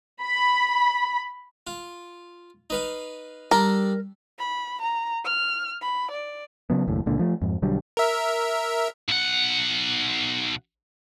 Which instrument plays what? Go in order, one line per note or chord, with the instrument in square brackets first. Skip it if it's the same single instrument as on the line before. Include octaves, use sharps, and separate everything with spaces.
[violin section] B5
[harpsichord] F4
D#4 B4 F5
[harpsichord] G3 D4 A4 [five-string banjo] A#4
[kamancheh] B5
A#5
F6
B5
D5
[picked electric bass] C#3 F#3 B3
F#1 D#2 A2
C#2 A#2 D3
F3 A3
F2 G#2
B1 D3 F#3 G3
[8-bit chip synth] A#4 E5
[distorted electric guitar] B1 F#5